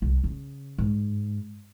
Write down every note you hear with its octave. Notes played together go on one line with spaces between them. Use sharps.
C2
C#3
G#2